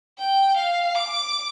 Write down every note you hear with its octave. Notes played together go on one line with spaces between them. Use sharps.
G5
F5
D6